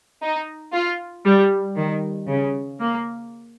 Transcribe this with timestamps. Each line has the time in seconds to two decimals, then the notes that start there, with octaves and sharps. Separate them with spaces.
0.22 D#4
0.73 F4
1.25 G3
1.76 D#3
2.27 C#3
2.79 A#3